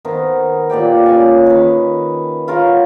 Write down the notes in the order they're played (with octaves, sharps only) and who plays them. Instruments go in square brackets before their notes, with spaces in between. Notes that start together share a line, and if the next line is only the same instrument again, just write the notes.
[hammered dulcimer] D#3 B3 A#4 C5
A#2 G4 D5 G5
C#3 G#5
D#3 B4
F4 A#4 C#5 F#5